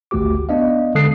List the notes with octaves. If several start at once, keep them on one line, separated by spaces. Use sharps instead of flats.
G#1 D2 A3 F#4 G4 D6
B3 D4 D#5 F5
D3 G#3 A4 D#6 F#6 C7